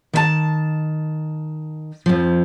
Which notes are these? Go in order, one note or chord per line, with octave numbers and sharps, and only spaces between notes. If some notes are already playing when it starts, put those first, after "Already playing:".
D#3 E5 A5
F2 F3